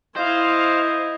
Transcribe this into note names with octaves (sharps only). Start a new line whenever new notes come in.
E4 C5 D#5 F5